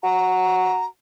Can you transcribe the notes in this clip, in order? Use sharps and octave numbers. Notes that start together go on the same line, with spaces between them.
F#4 A#5